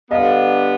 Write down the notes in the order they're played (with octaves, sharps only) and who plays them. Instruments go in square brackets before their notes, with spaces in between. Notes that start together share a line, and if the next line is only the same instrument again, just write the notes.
[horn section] D3 G3 B3 [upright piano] D#5 F5